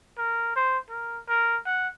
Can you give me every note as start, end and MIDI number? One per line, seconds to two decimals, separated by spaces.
0.18 0.53 70
0.56 0.78 72
0.89 1.19 70
1.29 1.57 70
1.66 1.88 78